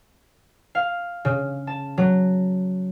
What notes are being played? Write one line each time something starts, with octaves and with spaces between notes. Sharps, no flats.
F5
C#3
A5
F#3